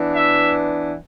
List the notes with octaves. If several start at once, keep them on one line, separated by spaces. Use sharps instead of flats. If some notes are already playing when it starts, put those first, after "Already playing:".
Already playing: E3 B3 D4
E5